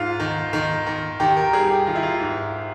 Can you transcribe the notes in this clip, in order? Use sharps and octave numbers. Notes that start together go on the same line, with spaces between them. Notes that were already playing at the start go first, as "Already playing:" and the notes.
Already playing: G#2 F4
D#3
D#3
D#3
D#3 G4
A#4
G3 G#4
G4
D#3 F4
E4
F4
G#2